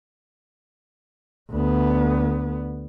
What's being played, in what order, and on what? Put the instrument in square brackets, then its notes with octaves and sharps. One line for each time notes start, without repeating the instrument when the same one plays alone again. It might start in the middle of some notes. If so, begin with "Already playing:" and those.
[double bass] D2 B3